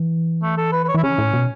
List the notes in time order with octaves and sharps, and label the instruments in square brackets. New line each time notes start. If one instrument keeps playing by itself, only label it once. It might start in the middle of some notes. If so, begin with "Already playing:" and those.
Already playing: [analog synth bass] E3
[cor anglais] A3
A4
B4
B4
C#5
[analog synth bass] E3 [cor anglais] E4
[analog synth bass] C#3 [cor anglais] C#4
[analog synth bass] A2
B2